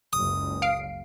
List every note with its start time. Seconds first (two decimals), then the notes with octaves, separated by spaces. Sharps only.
0.13 F#1 C#2 D#6
0.62 F5 C7 D7